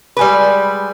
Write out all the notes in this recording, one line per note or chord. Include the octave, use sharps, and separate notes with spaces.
G3 G#3 B4